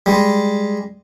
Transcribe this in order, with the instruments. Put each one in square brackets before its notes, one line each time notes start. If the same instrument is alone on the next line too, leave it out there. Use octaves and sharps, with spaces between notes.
[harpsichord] G3 G#3